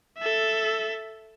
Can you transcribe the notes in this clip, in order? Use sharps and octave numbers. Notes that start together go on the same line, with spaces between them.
A4 E5